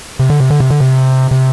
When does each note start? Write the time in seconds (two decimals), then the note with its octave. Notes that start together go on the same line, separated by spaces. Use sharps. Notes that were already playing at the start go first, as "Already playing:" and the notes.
0.19 C3
0.30 D3
0.40 C3
0.50 D3
0.60 C3
0.70 D3
0.81 C3
1.31 C3